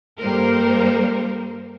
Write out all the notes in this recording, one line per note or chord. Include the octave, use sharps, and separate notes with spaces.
G2 G3 A#3 A4 A#4 C5